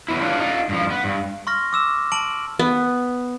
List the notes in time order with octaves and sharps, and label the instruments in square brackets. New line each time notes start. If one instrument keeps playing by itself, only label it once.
[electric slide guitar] F#3 B3 E4
D4 F4 G4 B4 C#5
D#4 F4
G2 F3
B3
G2
[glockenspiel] C6 C#6 F6 A#6
D6 E6 E7
A5 D7 F#7
[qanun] B3